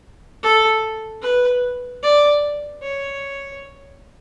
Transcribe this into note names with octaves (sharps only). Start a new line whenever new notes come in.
A4
B4
D5
C#5